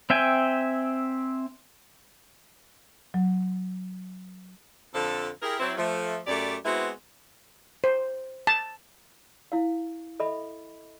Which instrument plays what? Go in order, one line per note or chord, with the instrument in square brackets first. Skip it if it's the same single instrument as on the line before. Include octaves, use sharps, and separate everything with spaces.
[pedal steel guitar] C4 E5 G5 G#5
[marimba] F#3
[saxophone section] F2 D3 F3 A4
E4 G4 G#4 A#4
F#3 C4 E4
F3 A3
F#2 A3 G4 D5
G#3 B3 C4 E4 F#4 B4
[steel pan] C5
A5
[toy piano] E4 F5
A4 D#5 E5 B5